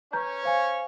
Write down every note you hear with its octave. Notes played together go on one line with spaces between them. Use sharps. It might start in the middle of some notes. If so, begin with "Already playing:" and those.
C#4 B4 C#5 A#5 G6
C5 F5 G#5